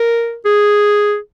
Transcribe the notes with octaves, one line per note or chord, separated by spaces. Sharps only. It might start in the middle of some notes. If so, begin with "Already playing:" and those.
Already playing: A#4
G#4